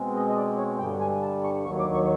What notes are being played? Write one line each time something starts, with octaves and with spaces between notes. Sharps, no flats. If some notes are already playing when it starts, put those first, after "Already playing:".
Already playing: B2 G#3 C4
D#5
D#5
D5
C#5
G2 D3 G3 G5
G#5
A5
C#6
D#2 D#3 F#3 C#6
D6
C#6